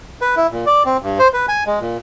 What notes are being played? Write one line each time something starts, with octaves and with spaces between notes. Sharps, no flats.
B4
E4
A#2
D5
C4
G2
C5
B4
G#5
G#3
A#2